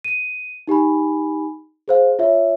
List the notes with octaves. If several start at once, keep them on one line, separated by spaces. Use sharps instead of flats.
D#7
D#4 G4 G#5 B5
G#4 C5 F5
F4 C#5 E5